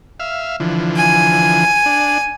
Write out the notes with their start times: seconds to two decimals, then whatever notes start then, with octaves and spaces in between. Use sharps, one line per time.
0.20 E5 F5
0.60 D3 E3 F3
0.96 G#5
1.86 D4